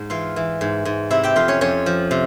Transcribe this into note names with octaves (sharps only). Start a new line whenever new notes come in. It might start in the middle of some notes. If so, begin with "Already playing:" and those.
Already playing: G#2
E3 F4 F5
E3
G#2
G#2
C3 E4 E5
G4 G5
F2 F4 F5
C#4 C#5
F2 C#4 C#5
F3
C3